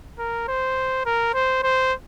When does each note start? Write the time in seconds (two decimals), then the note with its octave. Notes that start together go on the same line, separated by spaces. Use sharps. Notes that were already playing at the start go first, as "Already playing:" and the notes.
0.19 A#4
0.48 C5
1.06 A#4
1.34 C5
1.63 C5